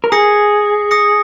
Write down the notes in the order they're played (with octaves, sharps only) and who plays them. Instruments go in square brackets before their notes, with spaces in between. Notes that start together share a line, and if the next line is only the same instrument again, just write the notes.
[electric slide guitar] A#4
[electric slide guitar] G#4 [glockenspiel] D#6 A#6 C#7
[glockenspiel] D#6 A#6 C#7